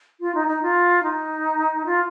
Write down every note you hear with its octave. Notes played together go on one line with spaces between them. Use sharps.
F4
D#4
D#4
F4
D#4
F4